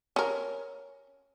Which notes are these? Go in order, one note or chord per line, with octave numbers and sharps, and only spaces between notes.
C#4 A#4